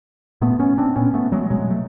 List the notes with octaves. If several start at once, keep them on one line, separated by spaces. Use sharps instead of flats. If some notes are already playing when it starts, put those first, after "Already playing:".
A#2 A3 B3
B3 C#4
C4 D4
A#2 B3 C#4
A3 B3
F#3 G#3
B2 F#3 G#3
A3